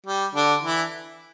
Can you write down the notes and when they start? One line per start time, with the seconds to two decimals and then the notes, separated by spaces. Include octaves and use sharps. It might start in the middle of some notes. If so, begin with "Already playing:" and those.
0.07 G3
0.35 D3 D4
0.63 E3 E4